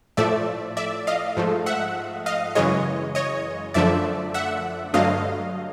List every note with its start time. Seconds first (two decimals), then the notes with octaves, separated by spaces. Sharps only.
0.17 A2 F3 A3 D5 E5
0.77 D5 E5
1.07 D#5 F5
1.37 G#2 F3 A3
1.66 E5 F#5
2.26 D#5 F5
2.55 F#2 C#3 E3 G#3 C#5 D#5
3.15 C#5 D#5
3.74 F#2 D3 F3 A3 D5 E5
4.34 E5 F#5
4.94 G2 D3 F#3 A3 D#5 F5